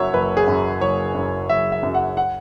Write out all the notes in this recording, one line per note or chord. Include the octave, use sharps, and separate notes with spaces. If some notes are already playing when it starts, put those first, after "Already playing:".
Already playing: F#1 F#2 F#3 C#5 E5
F#1 B4
G#4
F#2 F#3
F#1 C#5
F#2 F#3
F#1 E5
E5
F#2 F#3
F#5
F#5